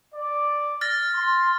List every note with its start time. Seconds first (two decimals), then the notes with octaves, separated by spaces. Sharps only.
0.14 D5
0.81 F6 A6 A#6
1.14 C6